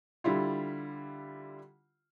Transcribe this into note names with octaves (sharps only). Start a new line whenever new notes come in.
D3 G3 E4 F4